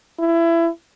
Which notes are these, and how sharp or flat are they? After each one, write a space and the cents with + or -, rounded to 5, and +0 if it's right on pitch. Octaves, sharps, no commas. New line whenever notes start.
E4 +25